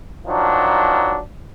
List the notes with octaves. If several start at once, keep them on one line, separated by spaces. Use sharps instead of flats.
D#3 F3 F#3 D4